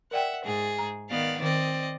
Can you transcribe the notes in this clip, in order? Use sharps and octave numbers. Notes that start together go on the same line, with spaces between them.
A#4 D5 E5 F#5 G5
G#2 G#4
A#5
D#3 B3 D5 F5
D#3 C4 D5 D#5